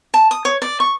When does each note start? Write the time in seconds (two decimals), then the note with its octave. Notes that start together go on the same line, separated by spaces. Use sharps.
0.14 A5
0.31 D#6
0.45 C#5
0.62 D5
0.80 C#6